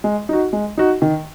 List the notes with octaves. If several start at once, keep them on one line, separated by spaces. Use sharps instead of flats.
G#3
D#4 F#4
G#3
D#4 F#4
D#3